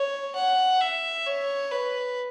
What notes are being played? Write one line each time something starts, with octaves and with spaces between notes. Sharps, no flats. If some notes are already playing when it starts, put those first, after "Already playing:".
Already playing: C#5
F#5
E5
C#5
B4